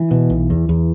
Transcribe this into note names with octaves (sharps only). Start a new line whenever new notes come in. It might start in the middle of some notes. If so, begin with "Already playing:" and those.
Already playing: E3
B2
B1
E2
E2